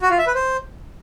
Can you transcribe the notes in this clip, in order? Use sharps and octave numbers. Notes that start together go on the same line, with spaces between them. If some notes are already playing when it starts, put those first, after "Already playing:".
F#4
F4
E5
B4
C5